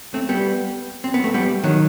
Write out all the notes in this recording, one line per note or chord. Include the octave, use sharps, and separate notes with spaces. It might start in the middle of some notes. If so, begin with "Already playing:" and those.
A3 C4
G3 B3
C4
B3
A3
G3 B3
D#3 F#3